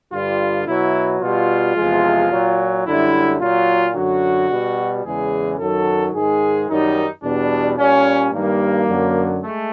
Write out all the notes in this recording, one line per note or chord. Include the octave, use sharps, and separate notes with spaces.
G2 D3 G3 F4
B2 F#3 E4
B2 G3 F4
E2 C3 F3 G#3
A#2 F#3
F#2 D3 G3 E4
A#2 F#3 F4
F#2 D3 F#3 F#4
B2 G3
E2 C#3 E3 G#3 G#4
F#2 D#3 F#3 A4
G#2 D#3 G#3 G#4
F#2 D#3 G3 D#4
E2 B2 G3 D4
A#2 G3 C#4
G2 D#3 G3 A#3
F#2 D3 F#3
G#3 A3